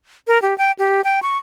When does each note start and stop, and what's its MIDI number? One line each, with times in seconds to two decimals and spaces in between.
0.27 0.41 70
0.42 0.56 67
0.58 0.72 79
0.79 1.01 67
1.04 1.20 79
1.22 1.37 85